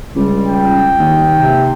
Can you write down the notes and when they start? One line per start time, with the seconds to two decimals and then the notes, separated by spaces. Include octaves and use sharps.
0.16 C#2 G3
0.46 G5
0.99 D#2
1.35 C3